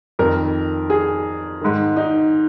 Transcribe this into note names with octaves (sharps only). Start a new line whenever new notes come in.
F2 D#3 A#4
G#4
G#2 D#3
D#4